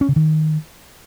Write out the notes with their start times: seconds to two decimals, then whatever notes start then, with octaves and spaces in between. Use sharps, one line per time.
0.01 C#4
0.09 C#3
0.16 D#3